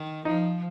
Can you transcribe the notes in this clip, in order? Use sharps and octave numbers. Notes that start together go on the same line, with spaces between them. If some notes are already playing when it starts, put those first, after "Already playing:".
Already playing: D#3
F3 D#4